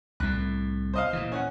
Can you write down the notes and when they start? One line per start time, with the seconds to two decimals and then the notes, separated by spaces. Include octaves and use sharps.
0.20 C2 A2 F#6
0.94 C5 D#5 F5
1.13 A#2 E3
1.32 C#4 F#5